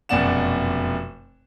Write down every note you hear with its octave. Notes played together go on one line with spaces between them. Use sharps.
F1 F#2 B2 D5 F#5 E7